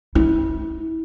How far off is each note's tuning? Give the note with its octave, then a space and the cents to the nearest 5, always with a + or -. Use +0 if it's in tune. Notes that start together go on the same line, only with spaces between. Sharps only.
E4 -30